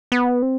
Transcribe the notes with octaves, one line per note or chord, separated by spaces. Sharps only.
B3
C4